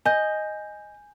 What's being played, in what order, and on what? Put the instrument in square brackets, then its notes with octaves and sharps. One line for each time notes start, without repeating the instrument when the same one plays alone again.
[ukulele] D#5 [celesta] G#5 G6